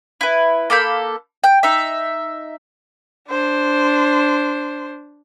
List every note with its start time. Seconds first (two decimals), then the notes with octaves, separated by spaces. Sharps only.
0.21 E4 B4
0.70 A#3 A4 B5 G6
1.44 G5
1.63 D#4 E5
3.29 D4 C5